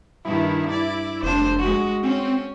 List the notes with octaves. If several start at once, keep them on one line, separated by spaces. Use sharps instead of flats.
G2 D#3 E4
D5
F1 D4 C5
G#3 F#4
C4 C#4